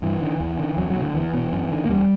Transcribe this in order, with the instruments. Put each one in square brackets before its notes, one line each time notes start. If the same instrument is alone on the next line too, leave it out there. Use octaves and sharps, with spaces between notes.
[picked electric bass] G2 E3
D3
E2
D3
E2 F#3
F#3
B2
D3
E2 E3
B2
F#2
D3
A#3
E2 G3